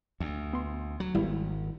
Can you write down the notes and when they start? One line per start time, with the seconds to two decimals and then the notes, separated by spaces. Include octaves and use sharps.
0.20 D2
0.53 B3 C6
1.00 F#3
1.14 G#1 G3 B3 E4